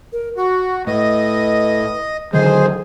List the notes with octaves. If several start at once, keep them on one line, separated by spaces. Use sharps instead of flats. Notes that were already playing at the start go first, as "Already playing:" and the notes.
A#4
F#4 C#6
A2 B4 D#5
D3 D#3 F#3 G#4 C5 D#5